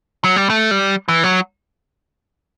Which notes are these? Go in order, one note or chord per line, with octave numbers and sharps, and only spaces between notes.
F#3
G3
A3
G3
E3
F#3